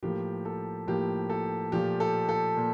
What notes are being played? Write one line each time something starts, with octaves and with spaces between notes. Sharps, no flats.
A2 F3 A#3 G4
A4
A2 F3 A#3 G4
A4
A#2 F3 A3 G4
A4
A4
A#2